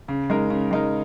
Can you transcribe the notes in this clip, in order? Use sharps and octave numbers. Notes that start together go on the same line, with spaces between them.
C#3
G#3 D#4 A#4
C#3
G#3 D#4 A#4